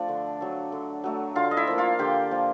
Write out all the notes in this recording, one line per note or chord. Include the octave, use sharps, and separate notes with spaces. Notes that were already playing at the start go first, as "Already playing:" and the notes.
Already playing: F3 A3 D4 D5
D3
F#3 A3
D3
F#3 A3
D3 F4 F5
D#5
E4 E5
F3 A#3
F4 F5
D3 G4 G5
F3 A#3